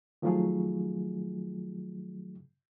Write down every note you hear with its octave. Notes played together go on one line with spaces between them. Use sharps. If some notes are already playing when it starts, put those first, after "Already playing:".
D#3 F3 F#3 A3 F4 G#4